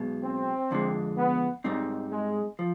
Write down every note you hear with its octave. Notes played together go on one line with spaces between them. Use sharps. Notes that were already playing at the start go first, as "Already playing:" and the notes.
Already playing: B1 B2 G#3
C4
F2 D3 G#3
B3
G#2 G3 C4 D#4
G#3
F3